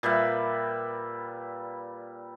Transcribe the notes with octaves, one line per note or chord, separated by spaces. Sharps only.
A#2 G3 B4 E5